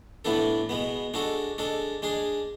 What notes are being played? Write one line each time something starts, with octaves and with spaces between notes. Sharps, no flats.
A2 E3 B3 D4 A4
B2 G#3 B3
G#3 D4 F#4 A4
G#3 D4 A4
G#3 D4 G#4